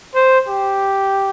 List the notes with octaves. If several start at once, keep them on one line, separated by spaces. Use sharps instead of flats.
C5
G4